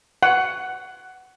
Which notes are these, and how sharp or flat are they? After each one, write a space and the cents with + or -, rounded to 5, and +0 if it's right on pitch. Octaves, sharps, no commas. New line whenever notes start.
F#5 +10